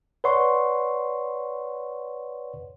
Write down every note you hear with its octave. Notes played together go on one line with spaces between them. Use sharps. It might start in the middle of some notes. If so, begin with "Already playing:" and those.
B4 C#5 D5 F#5 C6 C#6